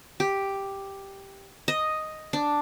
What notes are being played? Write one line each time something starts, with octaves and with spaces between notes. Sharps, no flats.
G4
D#5
D4